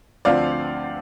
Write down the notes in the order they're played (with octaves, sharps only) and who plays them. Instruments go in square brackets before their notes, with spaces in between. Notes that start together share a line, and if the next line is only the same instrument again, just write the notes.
[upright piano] D2 D3 F3 C4 D5 F5